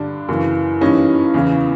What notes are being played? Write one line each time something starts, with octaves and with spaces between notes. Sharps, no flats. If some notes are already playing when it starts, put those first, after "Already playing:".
Already playing: G2 D3 D4
F#2 C#3 E3
G2 E3 C#4 D#4
E2 C#3 E3